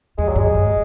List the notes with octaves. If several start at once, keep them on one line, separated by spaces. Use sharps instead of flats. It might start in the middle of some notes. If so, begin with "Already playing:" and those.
F2 G#3
F#3
F#2
G#3
G#2